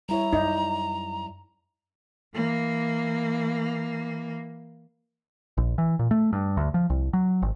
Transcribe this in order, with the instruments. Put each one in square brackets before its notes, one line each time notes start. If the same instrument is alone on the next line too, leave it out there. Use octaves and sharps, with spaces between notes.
[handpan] G3 E4 C#5 [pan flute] A#5
[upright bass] F#2 [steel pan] D#4 [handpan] D5
[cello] E3 A#3
[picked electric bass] A#1
E3
A#2
A3
G2
D2
F3
C2
F#3
G#1